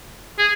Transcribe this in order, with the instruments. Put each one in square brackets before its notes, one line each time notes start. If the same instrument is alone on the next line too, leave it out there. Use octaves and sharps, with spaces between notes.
[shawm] G#4